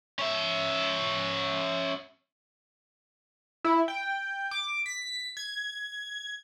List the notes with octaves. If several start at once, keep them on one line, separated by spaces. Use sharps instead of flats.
C#4 E5
E4
G5
D6
B6
G#6